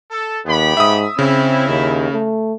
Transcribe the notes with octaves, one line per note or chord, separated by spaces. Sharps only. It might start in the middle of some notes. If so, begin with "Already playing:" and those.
A4
D#2 B3 G4 B5
G#2 E5 D#6
C#3 C4 E4
D#2
A3